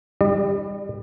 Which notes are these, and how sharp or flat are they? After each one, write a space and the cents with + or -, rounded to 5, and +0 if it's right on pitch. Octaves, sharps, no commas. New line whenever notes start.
G3 +20 D5 +45